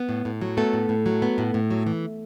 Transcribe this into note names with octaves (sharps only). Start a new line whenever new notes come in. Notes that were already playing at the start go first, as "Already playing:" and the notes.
Already playing: B3
A2
A2
F#3
A3 B3 A4
A2
A2
F#3
B3
A2
A2
F#3
E3